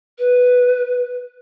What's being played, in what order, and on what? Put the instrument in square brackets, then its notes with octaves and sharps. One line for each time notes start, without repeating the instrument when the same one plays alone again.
[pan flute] B4